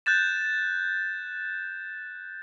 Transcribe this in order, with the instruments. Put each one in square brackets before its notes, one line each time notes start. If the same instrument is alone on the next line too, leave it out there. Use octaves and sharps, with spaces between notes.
[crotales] F#6 G6 A6 E7